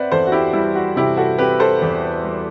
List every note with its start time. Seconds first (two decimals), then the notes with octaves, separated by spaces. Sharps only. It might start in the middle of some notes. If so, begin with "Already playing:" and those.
Already playing: C4 B4 C5 D5 E5 F#5
0.12 E2 A4 C5
0.27 F#4
0.32 E4 G4
0.53 G3 E4
0.75 F#4
0.96 C3 E4 G4
1.17 F#4 A4
1.38 C4 G4 B4
1.60 A4 C5
1.82 E2
2.24 G3